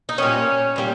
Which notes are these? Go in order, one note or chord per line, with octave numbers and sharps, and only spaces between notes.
D#4
A#2 G3 A#3 C#4
A#2 G3 A#3